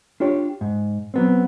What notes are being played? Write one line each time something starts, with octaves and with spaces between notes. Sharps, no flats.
D4 F4 G4 C#5
G#2
F#3 B3 C4